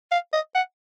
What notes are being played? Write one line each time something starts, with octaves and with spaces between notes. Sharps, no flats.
F5
D#5
F#5